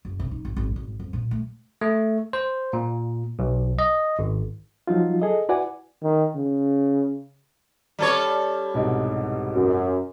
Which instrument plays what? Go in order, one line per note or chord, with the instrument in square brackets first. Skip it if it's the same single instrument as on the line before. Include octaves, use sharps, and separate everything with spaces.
[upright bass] F#1
C3
D#4
G#1
G#1
G#1
F2
A#2
A3
[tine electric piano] A3
C5
A#2
B1
D#5
G#1
[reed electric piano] F3 F#3 D#4 F4
G#4 A4 D#5
E4 F#4 B4 D5 F#5 G#5
[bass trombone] D#3
C#3
[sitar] G3 A4 C#5
[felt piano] C2 G#2 B2
[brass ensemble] F#2